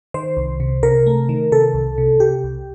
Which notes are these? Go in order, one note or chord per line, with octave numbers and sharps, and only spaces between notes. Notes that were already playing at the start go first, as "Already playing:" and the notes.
D#3 C5
C2
C3
C3 A#4
A3
D#3
C3 A4
C2
C3
C3 G4
C2